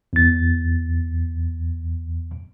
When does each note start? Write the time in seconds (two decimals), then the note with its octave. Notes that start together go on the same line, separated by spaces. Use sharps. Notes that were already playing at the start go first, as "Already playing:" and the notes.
0.13 E2 A6